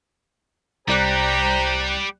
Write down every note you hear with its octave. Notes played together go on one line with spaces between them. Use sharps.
C2 G3 G4 C5 D5 A#5 F#6